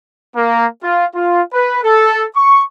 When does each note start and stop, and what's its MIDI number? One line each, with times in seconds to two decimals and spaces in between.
0.36 0.66 58
0.83 1.04 65
1.15 1.42 65
1.52 1.78 71
1.84 2.25 69
2.35 2.62 85